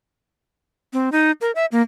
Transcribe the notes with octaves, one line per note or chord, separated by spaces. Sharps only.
C4
D#4
A#4
E5
A#3